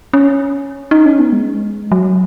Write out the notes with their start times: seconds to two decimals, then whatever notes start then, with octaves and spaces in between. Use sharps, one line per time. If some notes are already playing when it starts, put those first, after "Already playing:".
0.13 C#4
0.91 D#4
1.06 C#4
1.19 B3
1.33 G#3
1.92 F#3